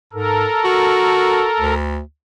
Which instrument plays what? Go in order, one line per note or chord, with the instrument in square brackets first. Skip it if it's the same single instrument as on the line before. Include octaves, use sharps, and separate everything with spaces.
[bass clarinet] G#2 [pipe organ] A4 A#4
[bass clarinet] F#4
D2